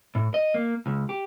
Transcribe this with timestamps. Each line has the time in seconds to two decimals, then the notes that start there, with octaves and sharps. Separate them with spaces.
0.15 A2
0.34 D#5
0.54 A#3
0.86 C#2
1.09 G4